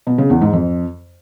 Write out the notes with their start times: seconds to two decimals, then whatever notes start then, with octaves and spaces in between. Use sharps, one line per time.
0.07 B2
0.18 C#3
0.30 E2
0.41 G#2
0.53 F2